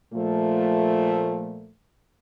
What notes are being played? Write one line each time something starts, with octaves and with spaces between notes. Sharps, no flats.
A#2 F3 A3